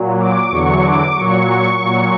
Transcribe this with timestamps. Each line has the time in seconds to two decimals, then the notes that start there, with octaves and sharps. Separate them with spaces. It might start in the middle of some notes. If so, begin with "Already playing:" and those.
Already playing: A#2 F#3
0.19 D6
0.50 E2 D3 F#3 C#6
0.83 D6
1.15 A#2 F#3 C#6
1.79 F#3
1.84 A#2